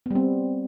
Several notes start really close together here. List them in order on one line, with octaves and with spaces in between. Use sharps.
B3 G3 C4